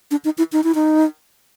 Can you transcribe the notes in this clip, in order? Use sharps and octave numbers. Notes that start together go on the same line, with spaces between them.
D4
D#4
E4
D#4
E4
D#4